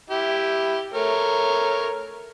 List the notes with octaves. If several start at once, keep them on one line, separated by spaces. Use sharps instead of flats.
E4 G4
A3 A#4 C#5